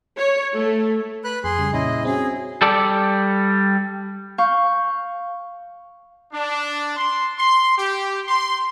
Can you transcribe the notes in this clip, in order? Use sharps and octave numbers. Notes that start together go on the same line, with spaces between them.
C#5
A3
B4 B5 F#6
F2 G#4 C6
C#3 G3
A#2 C#4 E4 D#5
C4 C#4 F#4 G#4
G3 A4 D5
F5 C#6 G6
D4
C6
C6
G4
C6